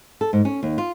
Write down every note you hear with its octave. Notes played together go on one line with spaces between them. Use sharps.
A4
G#2
C#4
D#2
F4